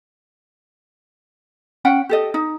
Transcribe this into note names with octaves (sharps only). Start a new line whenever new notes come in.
C#4 F#5 G5
G4 A4 D#5
D#4